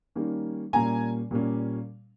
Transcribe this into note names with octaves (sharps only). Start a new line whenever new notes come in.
D#3 G3 A#3 C#4
A#2 G3 A#3 C#4 G#5 A#5
A#2 G3 A#3 C#4